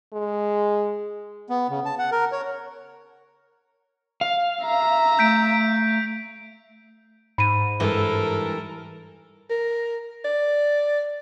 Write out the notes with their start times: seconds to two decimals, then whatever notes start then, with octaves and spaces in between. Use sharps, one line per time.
0.13 G#3
1.50 B3
1.69 C#3
1.85 A5
1.99 F#5
2.12 A#4
2.32 C#5
4.21 F5
4.64 E5 A#5
5.19 A3 G6 B6 D7
7.38 G#2 B5 D#7
7.80 G2 E3 G#3 A4 A#4
9.51 A#4
10.25 D5